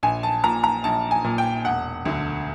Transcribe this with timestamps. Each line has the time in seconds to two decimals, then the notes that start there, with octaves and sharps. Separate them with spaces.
0.03 A#1 G#5
0.23 A5
0.44 A#2 A#5
0.64 A#5
0.84 A#1 A5
1.11 G#5
1.24 A#2
1.38 G5
1.65 E1 F#5
2.05 D2 D3